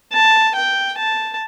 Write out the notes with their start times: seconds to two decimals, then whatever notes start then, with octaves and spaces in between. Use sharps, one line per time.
0.13 A5
0.56 G5
0.98 A5